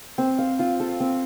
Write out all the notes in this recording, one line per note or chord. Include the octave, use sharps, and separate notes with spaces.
C4
F5
F4
A4
C4